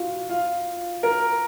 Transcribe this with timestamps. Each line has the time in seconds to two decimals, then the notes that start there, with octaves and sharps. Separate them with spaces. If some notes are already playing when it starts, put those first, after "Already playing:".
Already playing: F4 F#4
0.29 F4
1.03 A#4